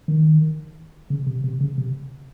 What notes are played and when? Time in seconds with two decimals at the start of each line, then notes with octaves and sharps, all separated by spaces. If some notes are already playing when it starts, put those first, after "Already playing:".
0.08 D#3
1.10 C#3
1.27 C3
1.44 C3
1.61 C#3
1.78 C3